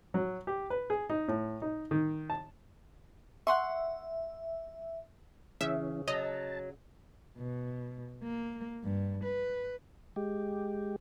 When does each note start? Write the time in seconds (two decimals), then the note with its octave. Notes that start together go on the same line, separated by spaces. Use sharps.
0.14 F#3
0.47 G4
0.70 B4
0.90 G#4
1.10 D#4
1.28 A2
1.62 D#4
1.91 D#3
2.30 A5
3.47 E5 F#5 C6 C#6
5.61 C#3 E3 C#4 E5
6.08 F#3 D#5 A5
7.38 B2
8.23 A#3
8.84 G2
9.25 B4
10.16 G#3 G4